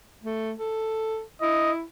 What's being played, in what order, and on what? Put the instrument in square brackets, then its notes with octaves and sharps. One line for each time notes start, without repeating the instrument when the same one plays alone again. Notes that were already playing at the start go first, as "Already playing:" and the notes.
[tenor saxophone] A3
A4
[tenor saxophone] E4 [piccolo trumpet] D#5